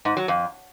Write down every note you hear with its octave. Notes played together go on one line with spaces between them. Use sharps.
G#2
F#3
F2